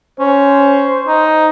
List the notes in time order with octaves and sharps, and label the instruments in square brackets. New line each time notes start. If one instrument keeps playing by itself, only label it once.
[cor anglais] C#4 [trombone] C5
[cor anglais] D#4